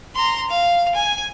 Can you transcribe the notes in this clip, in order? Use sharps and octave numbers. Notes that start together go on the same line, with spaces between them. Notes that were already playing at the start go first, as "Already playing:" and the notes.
A#5 C6
F5
G#5